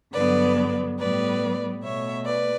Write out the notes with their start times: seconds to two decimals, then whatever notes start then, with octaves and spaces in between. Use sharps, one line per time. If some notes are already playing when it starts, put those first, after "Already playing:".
0.13 G2 D3 F#3 B3 B4 D5
0.99 A2 G3 B3 B4 D5
1.84 B2 A3 C#5 E5
2.26 B4 D5